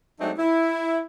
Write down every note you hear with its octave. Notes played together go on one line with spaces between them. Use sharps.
F#3 G#3 A3 C4 D4 D#4
E4